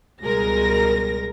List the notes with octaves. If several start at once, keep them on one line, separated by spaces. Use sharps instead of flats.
C#2 B2 G3 G#3 A#4 A#6